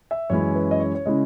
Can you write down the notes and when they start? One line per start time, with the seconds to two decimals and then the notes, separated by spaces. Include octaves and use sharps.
0.11 E5
0.30 F#2 E3 G#3 C#4 E4 C#5
0.55 B4
0.71 D#5
0.80 C#5
0.95 C#5
1.06 C#3 G#3 C#4 E4 D#5